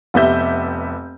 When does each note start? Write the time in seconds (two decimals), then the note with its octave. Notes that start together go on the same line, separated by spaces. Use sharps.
0.14 F1 B3 G4 E5 G6